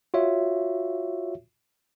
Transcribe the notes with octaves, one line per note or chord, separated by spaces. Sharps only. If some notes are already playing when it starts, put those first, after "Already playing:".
F4 F#4 C#5 E5